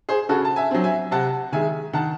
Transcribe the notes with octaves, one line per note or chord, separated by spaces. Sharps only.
G#4 C5
C#3 F#4 A4
A5
E5 G#5
F#3 C4
E5 G#5
C3 F#5 A5
D#3 G#3 E5 G#5
D#3 F#5 A5